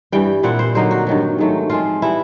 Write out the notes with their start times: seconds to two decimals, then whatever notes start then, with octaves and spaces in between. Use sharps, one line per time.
0.12 G2 E3 G3 G5
0.43 A#2 G3 C4 E4 F#5
0.59 C5
0.75 D3 F#3 A#3 D#4 C5
0.91 F#4
1.07 G2 D#3 F#3
1.38 G#2 D#3 F#3 A3
1.70 F3 G#3 C4 F4
2.02 E3 G3 B3 E4